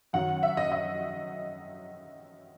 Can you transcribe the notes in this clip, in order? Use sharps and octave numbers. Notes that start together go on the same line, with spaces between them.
F#2 D#3 F#3 F#5
E5
D#5
D#5